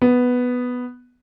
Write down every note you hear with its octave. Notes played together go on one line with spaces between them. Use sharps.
B3